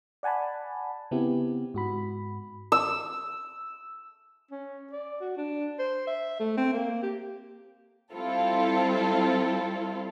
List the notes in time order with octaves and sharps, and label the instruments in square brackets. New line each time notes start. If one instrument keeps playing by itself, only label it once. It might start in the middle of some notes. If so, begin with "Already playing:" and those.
[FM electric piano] D5 F#5 G#5 A5 B5
C#3 B3 C4 E4 G4
G#2 F#4 B5
[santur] E6
[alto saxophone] C#4
D5
F#4
D4
C5
E5
A3
C4
A#3
G4
[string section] G3 C4 E4 F4 A4